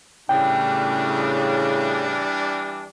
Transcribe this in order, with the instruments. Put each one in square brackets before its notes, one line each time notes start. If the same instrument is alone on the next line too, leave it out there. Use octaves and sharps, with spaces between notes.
[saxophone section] A2 C#3 [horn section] E3 G3 D4 [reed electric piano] G5